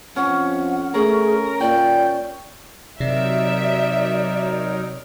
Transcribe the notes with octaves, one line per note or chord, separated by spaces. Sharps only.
F2 C#4 F#5
A3 C#4 G#4 A#4
A#2 D5 G5
C3 F#3 D#4 A#4 D5 E5